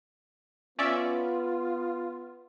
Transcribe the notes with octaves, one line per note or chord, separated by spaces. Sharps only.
B3 C#4 F4 D5 E5